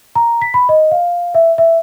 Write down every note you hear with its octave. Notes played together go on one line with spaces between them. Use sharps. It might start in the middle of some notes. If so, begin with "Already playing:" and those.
A#5
B6
B5
D#5
F5
E5
E5